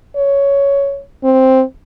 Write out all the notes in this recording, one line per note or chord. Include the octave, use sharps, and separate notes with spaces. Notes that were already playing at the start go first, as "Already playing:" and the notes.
C#5
C4